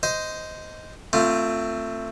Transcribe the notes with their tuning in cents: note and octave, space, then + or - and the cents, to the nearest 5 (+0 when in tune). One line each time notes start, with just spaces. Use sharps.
C5 -10 D#5 +10
A3 +20 C4 +0 F4 +0